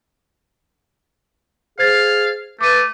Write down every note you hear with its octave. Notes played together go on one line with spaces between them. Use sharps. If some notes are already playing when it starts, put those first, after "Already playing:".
G#4 C5 F5 G#6 A6
A3 B4 D6 D#7